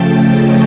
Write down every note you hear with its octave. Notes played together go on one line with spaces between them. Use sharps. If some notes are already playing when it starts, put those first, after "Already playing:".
Already playing: C#3 F3 A3 G5 A5
C#5 D#5